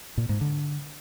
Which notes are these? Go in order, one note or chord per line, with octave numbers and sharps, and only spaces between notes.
A#2
G#2
D3